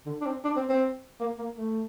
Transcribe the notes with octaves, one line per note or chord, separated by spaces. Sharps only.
D3
D4
C4
D4
C4
C4
A#3
A#3
A3